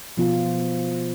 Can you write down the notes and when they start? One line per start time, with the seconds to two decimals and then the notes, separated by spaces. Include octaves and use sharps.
0.17 B2 F3 B3 F4